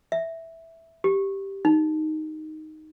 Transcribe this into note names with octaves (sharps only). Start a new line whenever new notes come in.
E5
G4
D#4